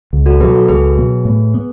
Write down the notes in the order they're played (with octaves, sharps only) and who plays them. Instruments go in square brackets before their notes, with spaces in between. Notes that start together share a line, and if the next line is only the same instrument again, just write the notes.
[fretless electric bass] C#2
[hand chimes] F#4 A4
[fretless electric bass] B2 F#3 [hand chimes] G#4 B4
[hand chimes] F#4 A4
[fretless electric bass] C#2 [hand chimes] G#4 B4
[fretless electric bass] B2 F#3
A2
B3